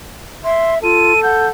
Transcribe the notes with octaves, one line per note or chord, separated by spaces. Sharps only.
E5 C6
F4 A4 D#7
F#5 G6